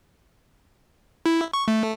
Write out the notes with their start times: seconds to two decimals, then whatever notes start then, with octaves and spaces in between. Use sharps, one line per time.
1.26 E4
1.53 C#6
1.68 A3